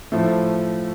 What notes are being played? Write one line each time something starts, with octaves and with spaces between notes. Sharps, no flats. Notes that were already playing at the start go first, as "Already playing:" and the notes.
A2 F3 A3